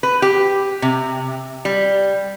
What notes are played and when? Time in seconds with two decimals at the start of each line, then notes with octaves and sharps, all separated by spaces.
0.03 B4
0.22 G4
0.82 C3
1.65 G3